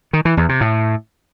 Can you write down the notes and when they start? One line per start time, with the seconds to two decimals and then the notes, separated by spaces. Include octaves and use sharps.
0.13 D#3
0.25 E3
0.37 E2
0.49 C3
0.61 A2